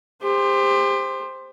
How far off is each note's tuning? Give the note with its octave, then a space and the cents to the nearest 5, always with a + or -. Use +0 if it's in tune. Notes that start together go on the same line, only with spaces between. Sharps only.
G4 +35 C5 +0